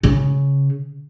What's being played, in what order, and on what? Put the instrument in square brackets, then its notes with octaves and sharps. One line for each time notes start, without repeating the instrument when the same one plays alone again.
[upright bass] C#3